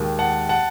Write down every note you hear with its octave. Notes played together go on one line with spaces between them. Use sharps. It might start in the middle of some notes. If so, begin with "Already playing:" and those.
Already playing: D#2 D#3 G#3
F#5 A5
F#5 A5